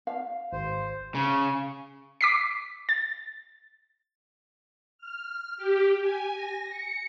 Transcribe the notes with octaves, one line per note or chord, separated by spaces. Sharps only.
F5
G#1 C5
C#3
D6 B6 C7
A6
F6
G4
G#5
A#6
C#7